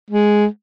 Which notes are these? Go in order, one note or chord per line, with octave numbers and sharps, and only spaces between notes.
G#3